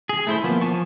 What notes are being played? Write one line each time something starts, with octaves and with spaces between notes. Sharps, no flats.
G#4
A3 E4 C5
F3 A#3 B3
F3 G#5 A5 C#6